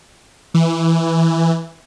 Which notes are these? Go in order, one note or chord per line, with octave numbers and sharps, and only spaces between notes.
E3